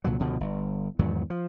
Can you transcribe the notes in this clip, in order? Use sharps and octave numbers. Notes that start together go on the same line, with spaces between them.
C2 A#2 D3 F#3
C#2 B2 D3 F3
G1
E2 G#2 D#3 F#3
F3